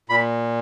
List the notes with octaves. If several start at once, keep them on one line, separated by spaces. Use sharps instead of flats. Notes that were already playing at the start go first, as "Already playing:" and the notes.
A#2 B5